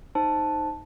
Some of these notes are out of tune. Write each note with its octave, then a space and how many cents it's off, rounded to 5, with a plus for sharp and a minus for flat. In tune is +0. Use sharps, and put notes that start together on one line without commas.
D#4 +0 C5 +0 A5 +0